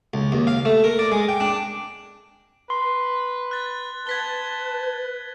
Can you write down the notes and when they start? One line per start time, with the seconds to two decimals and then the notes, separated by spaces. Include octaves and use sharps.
0.14 C#2
0.32 D#2
0.47 F5
0.65 A3
0.84 A#4
0.99 D5
1.12 G#3
1.29 G5
1.40 D4
2.70 B4 C6
3.51 F#6 A6
4.07 B4 A5 G#6 B6 G7